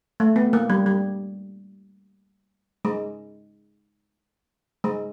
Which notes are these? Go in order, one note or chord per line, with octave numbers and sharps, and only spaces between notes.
A3
B3
A#3
G3
G3
G#3
G#3